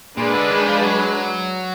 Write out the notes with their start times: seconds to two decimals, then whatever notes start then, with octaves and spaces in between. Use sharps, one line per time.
0.17 A#2 G#3 D4 G#4 B4
0.34 D3
0.51 D#3
0.67 F3
0.82 F#3